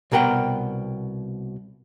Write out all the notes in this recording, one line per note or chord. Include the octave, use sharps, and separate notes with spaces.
C2 B2 A#4 F#5 G5